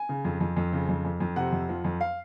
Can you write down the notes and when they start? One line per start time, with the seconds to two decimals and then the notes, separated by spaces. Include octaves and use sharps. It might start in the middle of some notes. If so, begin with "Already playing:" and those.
Already playing: G#5
0.09 C#3
0.25 F2
0.40 F2
0.57 F2
0.73 C#3
0.89 F2
1.05 F2
1.20 F2
1.36 C3 F#5
1.52 F2
1.69 F3
1.84 F2
2.01 F5